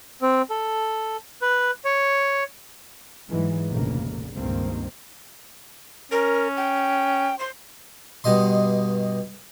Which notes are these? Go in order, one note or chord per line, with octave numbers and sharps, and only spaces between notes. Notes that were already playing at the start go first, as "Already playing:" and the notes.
C4
A4
B4
C#5
G#2 E3 F#3 G#3
F1 A#1 C#3 A#3
C#2 G2 D#3 A#3 C4
C#4 A#4
G5
C5 C6
G2 B2 D#5 C6